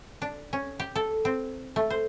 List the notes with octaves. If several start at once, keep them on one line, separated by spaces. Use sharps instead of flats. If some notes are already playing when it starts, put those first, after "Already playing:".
D4
C#4
G4
A4
C4
A3
C5